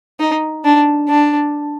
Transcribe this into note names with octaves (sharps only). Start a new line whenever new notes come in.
D#4
D4
D4